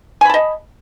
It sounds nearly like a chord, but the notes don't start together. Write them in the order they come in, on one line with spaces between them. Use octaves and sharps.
G#5 B5 A5 D#5